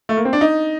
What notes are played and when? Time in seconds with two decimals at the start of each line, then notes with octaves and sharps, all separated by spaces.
0.09 A3
0.17 A#3
0.25 C4
0.33 D4
0.41 D#4